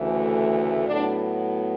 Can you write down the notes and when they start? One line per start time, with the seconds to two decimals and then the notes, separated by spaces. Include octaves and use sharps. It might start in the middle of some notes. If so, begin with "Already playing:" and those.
Already playing: D2 C#3 E3 A3
0.87 A2 F#3 B3 D4